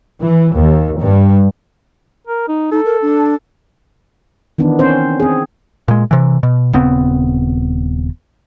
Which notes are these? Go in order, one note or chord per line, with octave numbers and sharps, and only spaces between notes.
E3
D#2
G2
A#4
D#4
D#4 A4
A#4
D4
D#3 E3 B3 D4 D#4
C4 C#4 C5
C4 G#4
A#2 G#3
C3 E3
B2
D#1 C#3 B3 C4